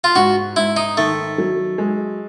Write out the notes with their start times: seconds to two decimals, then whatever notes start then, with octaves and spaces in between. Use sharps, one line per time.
0.04 F4
0.16 G#2 F#4
0.56 G#2 E4
0.76 D#4
0.97 D#3 A3
1.38 F#3
1.78 G#3